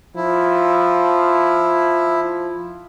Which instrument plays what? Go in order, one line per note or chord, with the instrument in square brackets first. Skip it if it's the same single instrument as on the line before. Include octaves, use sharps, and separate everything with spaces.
[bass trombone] F3 [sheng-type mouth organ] E4